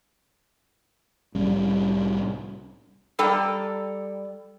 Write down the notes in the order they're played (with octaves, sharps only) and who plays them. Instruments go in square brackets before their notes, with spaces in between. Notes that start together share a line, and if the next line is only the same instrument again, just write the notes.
[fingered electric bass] C2 A2 G3 C#4
[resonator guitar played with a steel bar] G3 A4 G5 A#5